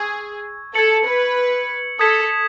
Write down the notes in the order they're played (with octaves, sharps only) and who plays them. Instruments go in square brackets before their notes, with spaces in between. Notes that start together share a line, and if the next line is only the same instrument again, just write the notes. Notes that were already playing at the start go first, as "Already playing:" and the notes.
Already playing: [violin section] G#4 [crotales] C#6 E6 G#6
[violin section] A4 [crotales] G#6 C#7 F#7
[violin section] B4
[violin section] A4 [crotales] D#6 G#6 B6 E7